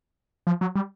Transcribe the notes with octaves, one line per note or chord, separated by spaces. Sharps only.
F3
F#3
G3